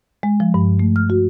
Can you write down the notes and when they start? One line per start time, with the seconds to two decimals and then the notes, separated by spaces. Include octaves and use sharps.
0.23 G#3
0.40 F3
0.54 G2
0.80 A3
0.96 F6
1.10 F#4